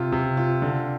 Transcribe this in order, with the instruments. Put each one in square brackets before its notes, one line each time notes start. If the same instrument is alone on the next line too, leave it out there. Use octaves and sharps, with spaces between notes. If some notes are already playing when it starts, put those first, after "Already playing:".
Already playing: [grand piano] C3 F4
C3
F4
D3